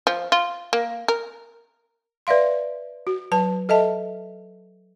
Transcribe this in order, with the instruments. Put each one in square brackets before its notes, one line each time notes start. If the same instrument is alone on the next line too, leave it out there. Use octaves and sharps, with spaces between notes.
[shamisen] F3
F4
A#3
A#4
[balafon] B4 D5 E5 F5 C6
F#4
F#3 B4 A5
A4 D#5 E5 A5